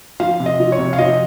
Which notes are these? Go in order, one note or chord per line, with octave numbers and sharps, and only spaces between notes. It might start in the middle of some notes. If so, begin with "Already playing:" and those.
F3 F5
C3
D#5
F3
C#5
C3
F5
F3 D#5